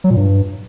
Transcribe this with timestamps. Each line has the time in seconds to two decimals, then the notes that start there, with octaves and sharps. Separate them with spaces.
0.04 F#3
0.10 A#2
0.17 G2